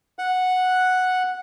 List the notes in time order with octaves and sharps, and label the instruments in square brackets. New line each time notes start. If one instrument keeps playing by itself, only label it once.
[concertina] F#5